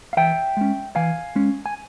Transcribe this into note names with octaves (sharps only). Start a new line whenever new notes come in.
F5
E3 E5 G5
G#3 C#4
E3 F5 G#5
G#3 C#4
G#5